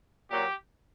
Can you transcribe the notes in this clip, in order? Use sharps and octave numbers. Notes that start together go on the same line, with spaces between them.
A#2 F#3 G4